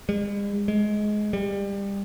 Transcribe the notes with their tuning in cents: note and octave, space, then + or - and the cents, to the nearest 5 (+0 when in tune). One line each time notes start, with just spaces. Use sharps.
G#3 -45
G#3 +15
G3 +25